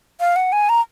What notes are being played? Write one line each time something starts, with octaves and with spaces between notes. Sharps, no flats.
F5
F#5
G#5
A#5